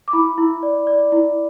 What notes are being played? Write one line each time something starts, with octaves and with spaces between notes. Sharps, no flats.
D6
E4 B5
E4
D5
D5
E4